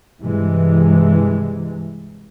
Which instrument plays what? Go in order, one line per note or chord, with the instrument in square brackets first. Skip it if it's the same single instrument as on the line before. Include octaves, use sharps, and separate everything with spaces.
[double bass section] G2 C3 E3 G#3